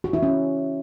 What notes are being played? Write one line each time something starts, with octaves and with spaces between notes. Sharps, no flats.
F#4
E4
C#4